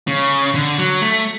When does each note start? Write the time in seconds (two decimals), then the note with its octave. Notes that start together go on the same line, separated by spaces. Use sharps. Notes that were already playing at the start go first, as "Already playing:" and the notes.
0.07 C#3
0.55 D3
0.78 F#3
1.02 A3